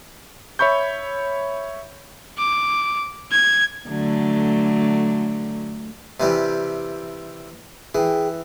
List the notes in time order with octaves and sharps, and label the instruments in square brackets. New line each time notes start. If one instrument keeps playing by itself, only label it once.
[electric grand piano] C#5 E5 B5 C#6 G6
[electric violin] D6
G#6
[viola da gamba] D3 F#3 A3
[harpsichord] C3 E3 G3
[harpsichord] E3 [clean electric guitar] G#4 G5